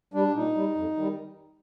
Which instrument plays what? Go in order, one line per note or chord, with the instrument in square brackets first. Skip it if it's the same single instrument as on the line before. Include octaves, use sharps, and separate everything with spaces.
[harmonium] G3 D4
A#2 D#4
G3
F2
D#3 G3